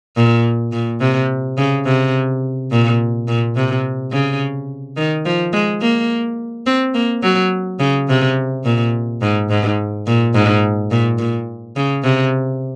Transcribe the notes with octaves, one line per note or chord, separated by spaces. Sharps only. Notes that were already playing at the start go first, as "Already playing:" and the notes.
A#2
A#2
C3
C#3
C3
A#2
A#2
C3
C#3
D#3
F3
G#3
A#3
C4
A#3
F#3
C#3
C3
A#2
G#2
G#2
A#2
G#2
A#2
A#2
C#3
C3